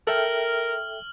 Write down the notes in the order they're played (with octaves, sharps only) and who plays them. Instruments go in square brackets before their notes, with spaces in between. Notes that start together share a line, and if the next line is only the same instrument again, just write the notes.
[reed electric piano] A4 E5 G5 [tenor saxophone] A#4 [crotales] F6 F#7